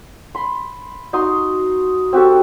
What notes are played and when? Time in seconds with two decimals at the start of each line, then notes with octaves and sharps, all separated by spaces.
0.35 B5 C6
1.13 D#4 F#4 C6 D#6
2.13 C4 F#4 G4 A4